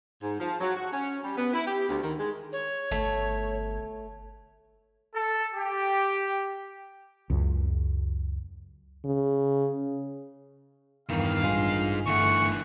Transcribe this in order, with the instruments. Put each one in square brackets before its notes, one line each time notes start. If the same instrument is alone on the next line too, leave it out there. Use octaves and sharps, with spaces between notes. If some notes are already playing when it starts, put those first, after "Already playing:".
[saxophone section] G#2
F3
F#3
F#4
C#4
G3
B3
E4
G4
D2
D#3
G#3
[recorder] C#5
[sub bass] G1 [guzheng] A3
[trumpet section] A4
G4
[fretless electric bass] C#2 F#2 C#3
[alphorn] C#3
[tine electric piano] E2 G2 A#4 [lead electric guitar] D#3 E3 [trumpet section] F5
[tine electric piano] A1 G2 F4 [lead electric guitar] D#4 G#4
[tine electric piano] G1 A3 [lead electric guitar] D3 E3 [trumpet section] F#5 C#6